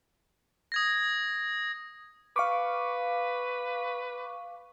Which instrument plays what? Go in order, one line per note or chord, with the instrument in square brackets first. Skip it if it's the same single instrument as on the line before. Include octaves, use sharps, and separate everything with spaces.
[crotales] D#6 G#6 A#6
[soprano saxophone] B4 [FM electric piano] F5 C#6 D6